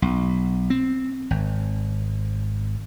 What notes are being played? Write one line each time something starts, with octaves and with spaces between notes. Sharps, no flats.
B1
C4
G#1